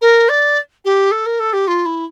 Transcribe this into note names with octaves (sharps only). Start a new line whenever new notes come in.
A#4
D5
G4
A4
A#4
A4
G4
F4
E4